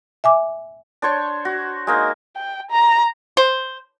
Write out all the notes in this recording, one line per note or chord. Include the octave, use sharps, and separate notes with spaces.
E5 G#5 D6
D4 C5 C#5 C#6
F#4
G#3 A#3 D#4
G5
A#5
C5